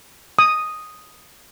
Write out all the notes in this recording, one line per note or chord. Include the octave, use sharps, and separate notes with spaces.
D#6